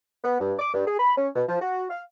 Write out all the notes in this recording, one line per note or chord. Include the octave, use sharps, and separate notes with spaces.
B3
G2
D6
G2
G#4
B5
C#4
B2
F3
F#4
F5